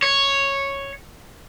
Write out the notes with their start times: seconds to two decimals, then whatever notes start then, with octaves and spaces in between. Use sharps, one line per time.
0.02 C#5